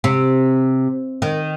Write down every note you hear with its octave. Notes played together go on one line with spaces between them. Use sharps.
C3
D#3